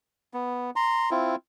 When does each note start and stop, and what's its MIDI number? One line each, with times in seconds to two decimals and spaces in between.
0.34 0.70 59
0.76 1.10 82
0.76 1.10 84
1.11 1.35 60
1.11 1.35 64
1.11 1.35 65